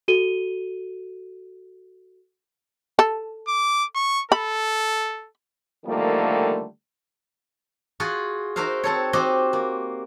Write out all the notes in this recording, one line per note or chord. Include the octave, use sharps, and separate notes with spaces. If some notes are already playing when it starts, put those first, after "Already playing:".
F#4 A4 D#7 G7
A4
D6
C#6
A4 B5
D3 D#3 F3 G3 A3 A#3
F4 F#4 G#4 F#5
D#4 F#4 A#4 C5 E5 F5
C4 A4 C#5
C4 F#4 G4 C5 D#5
A#3